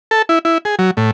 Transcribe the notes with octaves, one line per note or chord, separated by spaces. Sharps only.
A4
E4
E4
G#4
F#3
A2